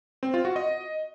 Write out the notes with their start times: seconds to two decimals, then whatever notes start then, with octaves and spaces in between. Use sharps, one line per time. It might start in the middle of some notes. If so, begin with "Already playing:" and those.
0.23 C4
0.34 F4
0.45 F#4
0.56 D#5